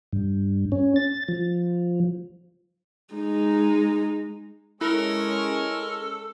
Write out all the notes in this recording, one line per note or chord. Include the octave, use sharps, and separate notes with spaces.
G2
C#4
A6
F3
G#3 D#4
G#3 C#4 E4 A4 A#4